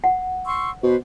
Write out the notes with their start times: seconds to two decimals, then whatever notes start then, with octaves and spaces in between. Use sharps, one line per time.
0.04 F#5
0.46 C6 C#6 E6
0.83 B2 B4 C5